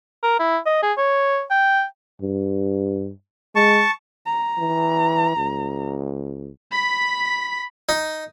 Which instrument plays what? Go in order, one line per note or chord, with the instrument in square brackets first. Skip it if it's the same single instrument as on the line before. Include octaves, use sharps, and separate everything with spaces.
[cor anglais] A#4
E4
D#5
G#4
C#5
G5
[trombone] G2
[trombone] G#3 [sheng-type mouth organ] A5 C#6
[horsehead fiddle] A#5
[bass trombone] E3
C#2
[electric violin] B5 B6
[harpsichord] D#4